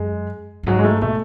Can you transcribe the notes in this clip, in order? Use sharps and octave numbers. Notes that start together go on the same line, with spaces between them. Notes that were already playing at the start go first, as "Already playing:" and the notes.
Already playing: F#2 G#3
F#2
G#2 F#3
G#3
A3
B2 A3